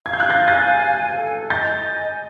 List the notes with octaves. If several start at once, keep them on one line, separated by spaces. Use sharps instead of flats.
F5 G#6
G6
F#6 G#6
G6 A6
G#5
A6
F#6 G#6
F5
A4
D#5 G6 A6
G#5